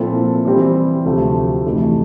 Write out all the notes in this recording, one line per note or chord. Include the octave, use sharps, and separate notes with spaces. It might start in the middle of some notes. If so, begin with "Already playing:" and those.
Already playing: A#2 F3 C4 E4 A4
E3 G3 C4 E4
D2 C3 F3 A3
F2 C3 E3 A3 E4